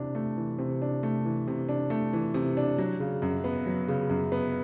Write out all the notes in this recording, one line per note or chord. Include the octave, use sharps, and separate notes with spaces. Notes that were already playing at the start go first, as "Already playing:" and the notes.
Already playing: C3 E3 D4
A3
E3
C3
D4
A3
E3
C3
D4
A3
E3
C3
D4
F#3
C#3
F#2
B3
F#3
C#3
F#2
B3